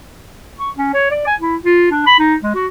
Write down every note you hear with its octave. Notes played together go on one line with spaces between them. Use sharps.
C#6
C#4
C#5
D5
G#5
E4
F4
D4
B5
D#4
G#3
F#4